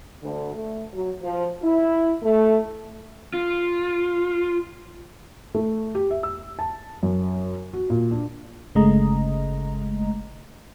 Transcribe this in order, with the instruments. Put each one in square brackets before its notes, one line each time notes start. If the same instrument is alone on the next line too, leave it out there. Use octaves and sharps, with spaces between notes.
[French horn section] D2
A3
F#3
F3
E4
A3
[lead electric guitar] F4
[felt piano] A3
G4
E5
E6
A5
F#2
F#4
A#2
D4
[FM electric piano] G1 C#3 G#3 A3 D#5 A#5